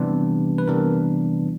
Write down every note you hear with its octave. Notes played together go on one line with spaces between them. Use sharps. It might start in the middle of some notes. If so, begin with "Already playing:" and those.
Already playing: C3 E3 G3 B3 D4
B4
C3 E3 G3 B3 D4 A#4